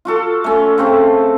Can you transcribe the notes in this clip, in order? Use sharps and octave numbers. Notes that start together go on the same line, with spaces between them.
F4 F#4 A4
A3 C#4
C#3 C4 A5